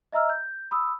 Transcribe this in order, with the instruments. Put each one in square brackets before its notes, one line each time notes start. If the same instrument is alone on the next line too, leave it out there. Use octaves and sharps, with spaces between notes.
[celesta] D#5 E5 A#5 E6 F6
G6
B5 D#6 E6